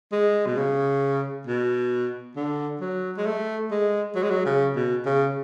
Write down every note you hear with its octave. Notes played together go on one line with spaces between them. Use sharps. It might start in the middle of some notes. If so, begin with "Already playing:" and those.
G#3
B2
C#3
B2
D3
F#3
G#3
A3
G#3
F#3
G#3
F#3
C#3
B2
C#3